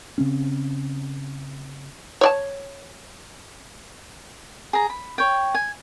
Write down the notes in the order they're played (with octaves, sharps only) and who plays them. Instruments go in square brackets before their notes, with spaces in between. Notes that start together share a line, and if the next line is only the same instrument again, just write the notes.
[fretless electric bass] C#3 C4 C#4
[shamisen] C#5 D5 A5
[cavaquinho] G#4 A#5
B5
C#5 G5
G#5